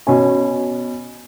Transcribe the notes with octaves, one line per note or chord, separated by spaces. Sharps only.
B2 C#4 G#5